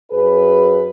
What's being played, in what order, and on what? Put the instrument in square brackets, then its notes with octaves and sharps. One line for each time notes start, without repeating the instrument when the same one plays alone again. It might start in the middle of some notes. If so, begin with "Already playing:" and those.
[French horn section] F#2 G#4 B4